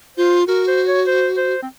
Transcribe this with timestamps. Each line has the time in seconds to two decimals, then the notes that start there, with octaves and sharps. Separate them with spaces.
0.17 F4 C5
0.47 F#4 A#4
0.68 C5
0.87 C#5
1.07 C5
1.37 C5
1.62 C4